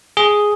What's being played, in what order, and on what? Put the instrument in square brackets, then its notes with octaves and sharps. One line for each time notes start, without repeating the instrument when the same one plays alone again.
[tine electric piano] G#4